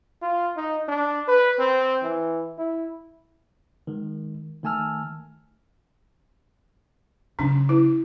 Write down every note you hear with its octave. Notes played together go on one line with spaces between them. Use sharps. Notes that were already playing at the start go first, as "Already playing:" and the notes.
F4
D#4
D4
B4
C4
E3
E4
D#3 G#3
D#3 A3 G#5 A5 E6 F6
C#3 F#3 C#4 D4
E4